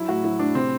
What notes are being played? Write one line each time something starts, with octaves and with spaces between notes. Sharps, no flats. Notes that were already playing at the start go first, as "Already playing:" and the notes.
Already playing: F#3 E4
A2 F#4
F#3 E4
A2 D4
C3 C4